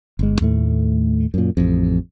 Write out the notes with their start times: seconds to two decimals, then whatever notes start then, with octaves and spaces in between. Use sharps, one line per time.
0.19 G1 G#3
0.41 D#2 A2 A3
1.34 F#2 A#2
1.57 A1 F2